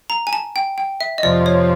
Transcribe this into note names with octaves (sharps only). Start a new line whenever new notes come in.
A#5
G#5
A5
G5
G5
E5
D#5
F2 C3 F3 D5
C#5